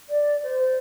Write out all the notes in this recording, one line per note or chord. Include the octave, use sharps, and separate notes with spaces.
D5
C5